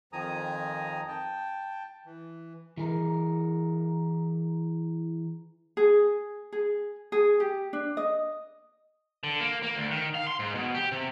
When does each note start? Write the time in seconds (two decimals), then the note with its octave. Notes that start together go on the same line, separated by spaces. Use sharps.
0.13 F2 D#3 F3 G#5 A#5 D#6
1.08 G5 A5
2.06 E3
2.77 E3 G#4 A#4
5.77 G#4
6.52 G#4
7.12 G#4
7.40 G4
7.73 D4
7.97 D#5
9.24 D3
9.40 A#3
9.63 A#3
9.76 D2
9.91 D#3
10.15 F5
10.28 C6
10.39 G#2
10.55 B2
10.75 G4
10.92 C3